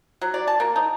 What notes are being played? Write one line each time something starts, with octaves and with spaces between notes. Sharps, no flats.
F#3
D5
A5
A#3
D#4